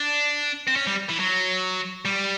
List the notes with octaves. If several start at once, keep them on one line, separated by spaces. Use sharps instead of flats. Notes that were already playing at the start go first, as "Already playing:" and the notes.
Already playing: D4
C4
C#4
G3
E3
F#3
G3